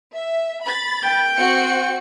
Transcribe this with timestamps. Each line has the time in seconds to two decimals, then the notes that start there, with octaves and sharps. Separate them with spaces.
0.14 E5
0.63 B5 A6
1.03 G5
1.36 C4 F#4 C#7